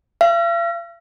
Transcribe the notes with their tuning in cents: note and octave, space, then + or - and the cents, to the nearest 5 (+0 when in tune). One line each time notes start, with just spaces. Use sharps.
F5 -45